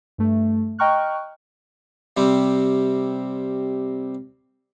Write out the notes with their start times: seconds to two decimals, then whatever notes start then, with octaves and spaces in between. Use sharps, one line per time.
0.18 G2 A3
0.79 D#5 G5 A#5 C#6 F6 F#6
2.17 C3 G3 C4